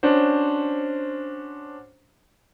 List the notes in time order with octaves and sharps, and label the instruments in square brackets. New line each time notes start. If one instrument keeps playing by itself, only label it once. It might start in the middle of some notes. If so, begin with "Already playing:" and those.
[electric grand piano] C#4 D4 F#4 C5